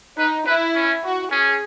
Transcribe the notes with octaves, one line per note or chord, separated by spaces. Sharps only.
D#4 B4
E4 B4
C#4
F#4
C#4 G#4